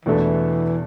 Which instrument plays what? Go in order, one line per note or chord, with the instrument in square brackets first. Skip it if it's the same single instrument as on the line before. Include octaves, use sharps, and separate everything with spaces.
[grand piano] E2 B2 A3 D4 A4 [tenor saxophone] E3